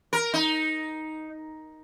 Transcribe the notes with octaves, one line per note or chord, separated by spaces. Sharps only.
A#4
D#4